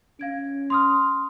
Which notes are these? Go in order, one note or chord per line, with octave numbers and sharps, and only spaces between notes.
C#4 F5 G#6 D7
C6 D#6 F6